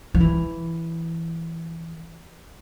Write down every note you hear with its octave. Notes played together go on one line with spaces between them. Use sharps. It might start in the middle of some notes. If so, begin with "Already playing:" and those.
F3
E3